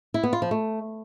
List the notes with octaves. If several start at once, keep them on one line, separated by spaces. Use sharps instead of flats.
E4
B3
F4
F3
A3